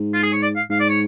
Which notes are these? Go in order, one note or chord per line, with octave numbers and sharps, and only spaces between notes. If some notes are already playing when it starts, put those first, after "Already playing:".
Already playing: G#2
F4
G#4
C#5
D5
F5
G#2 F5
D5
C#5